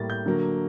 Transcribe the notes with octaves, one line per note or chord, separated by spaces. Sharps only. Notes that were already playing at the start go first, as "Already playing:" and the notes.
Already playing: A2 G3 A#3 A6
G6
D3 F#3 A#3